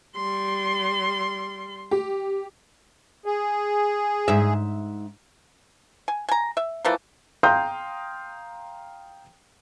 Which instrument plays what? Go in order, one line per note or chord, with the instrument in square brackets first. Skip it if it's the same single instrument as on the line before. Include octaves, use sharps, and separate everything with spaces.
[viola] G3 C6
[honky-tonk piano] G4
[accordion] G#4
[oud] G#2 E5
[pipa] G#5
G#5 A#5
E5
E3 F3 A3 A#3
[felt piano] F5 G5 A#5 C6 D#6 G6